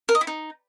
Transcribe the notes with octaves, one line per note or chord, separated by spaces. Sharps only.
A#4
D#5
E4
D#4